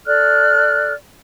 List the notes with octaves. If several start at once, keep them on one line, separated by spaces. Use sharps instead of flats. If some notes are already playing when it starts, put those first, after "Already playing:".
A4 D5 F6 F#6